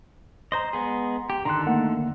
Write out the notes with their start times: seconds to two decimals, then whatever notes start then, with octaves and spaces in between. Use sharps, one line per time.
0.52 C5 D#5 A#5 C6
0.73 G#3 B3 G#4
1.30 G4
1.45 D3 D#3 A4 A#5 C6 F#6
1.66 A3 A#3 F#5